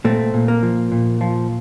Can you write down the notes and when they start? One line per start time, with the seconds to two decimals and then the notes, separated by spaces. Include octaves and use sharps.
0.04 A#2 A3 C4
0.34 A#2
0.48 A#3
0.63 F3
0.92 A#2
1.21 F3